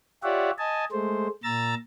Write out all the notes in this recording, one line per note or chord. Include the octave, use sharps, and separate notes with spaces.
F4 G4 C#5 D5 E5 F#5
D#5 G#5 A5
G#3 A3 C5
A#2 A#5 E6 A6